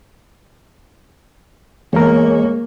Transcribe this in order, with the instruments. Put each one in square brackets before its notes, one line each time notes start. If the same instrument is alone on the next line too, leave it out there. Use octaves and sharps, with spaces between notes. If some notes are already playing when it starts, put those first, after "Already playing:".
[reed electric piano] E2 A#4 [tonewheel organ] G#3 C#5 [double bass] A#3